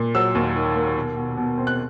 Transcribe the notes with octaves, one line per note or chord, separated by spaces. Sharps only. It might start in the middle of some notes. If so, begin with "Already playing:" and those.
Already playing: A#2
F#3 E6
D#2
D#3
A#3
B2
B2
B2
C4
F#6